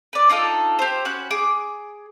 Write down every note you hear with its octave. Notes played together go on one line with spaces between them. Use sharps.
B4 D5
D4 D#4 F4 A4
G4 C5
C#4 F#4 B5 F#6
G#4 D6